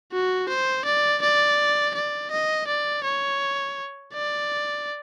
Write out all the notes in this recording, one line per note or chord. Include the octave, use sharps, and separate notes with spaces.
F#4
C5
D5
D5
D5
D#5
D5
C#5
D5